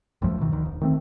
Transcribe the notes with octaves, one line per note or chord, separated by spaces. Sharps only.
A1 F#2 F3 A3
D1 B2 D#3 E3
D2 D#3
E1
D#3 A3 C4